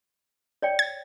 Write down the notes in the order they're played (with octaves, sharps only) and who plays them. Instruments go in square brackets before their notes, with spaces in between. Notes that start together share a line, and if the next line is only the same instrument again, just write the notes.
[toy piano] C#5 D5 G5
[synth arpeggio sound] G#6